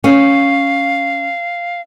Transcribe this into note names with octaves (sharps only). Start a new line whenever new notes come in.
C#4 F5